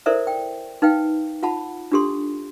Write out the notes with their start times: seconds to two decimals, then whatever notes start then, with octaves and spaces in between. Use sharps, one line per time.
0.06 E4 A4 A#4 C5 D5 E5
0.27 G5
0.82 D#4 B4 F5 G5
1.43 F4 F#5 A5 B5
1.92 D4 F4 G4 A4 C6